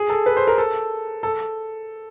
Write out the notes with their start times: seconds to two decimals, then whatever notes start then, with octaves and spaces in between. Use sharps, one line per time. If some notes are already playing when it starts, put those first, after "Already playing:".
Already playing: G#4
0.09 A4
0.26 B4
0.37 C5
0.47 A#4
0.58 A4
1.23 A4